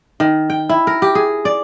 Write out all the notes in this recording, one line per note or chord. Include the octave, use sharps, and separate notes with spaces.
D#3
G5
E4
A#4
G4
G#4
D5